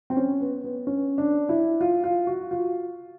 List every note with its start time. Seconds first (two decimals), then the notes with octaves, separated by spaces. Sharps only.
0.10 C4
0.17 C#4
0.40 B3
0.64 B3
0.87 C#4
1.18 D4
1.49 E4
1.81 F4
2.04 F4
2.27 F#4
2.51 F4